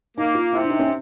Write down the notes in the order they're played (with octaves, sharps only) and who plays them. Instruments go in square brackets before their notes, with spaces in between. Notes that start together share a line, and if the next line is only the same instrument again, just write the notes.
[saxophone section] A#3 [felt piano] D#4
[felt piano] F4
[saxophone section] C3 [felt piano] E4
[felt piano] D4
D#4
C#4